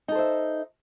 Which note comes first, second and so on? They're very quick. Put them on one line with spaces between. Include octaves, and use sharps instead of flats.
D#4 A4 C5 E5